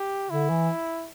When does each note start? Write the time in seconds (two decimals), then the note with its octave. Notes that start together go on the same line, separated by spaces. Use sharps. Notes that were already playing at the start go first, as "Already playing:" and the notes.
Already playing: G4
0.30 D3 E4
0.50 E3